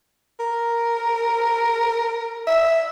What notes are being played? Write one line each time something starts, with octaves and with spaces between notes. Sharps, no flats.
A#4
E5